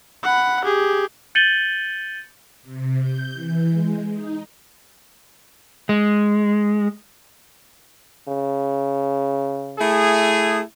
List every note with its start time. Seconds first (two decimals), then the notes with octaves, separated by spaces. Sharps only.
0.23 F#5 B5
0.64 G4 G#4
1.35 G6 A6 C#7 D#7 F#7 G7
2.63 C3
3.01 G6
3.33 E3
3.69 G#3
4.12 D#4
5.89 G#3
8.28 C#3
9.80 A3 E4 G#4